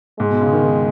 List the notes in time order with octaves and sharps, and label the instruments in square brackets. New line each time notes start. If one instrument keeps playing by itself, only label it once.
[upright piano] G#2 [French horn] G#3
[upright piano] B2
C#3
D#3
D#3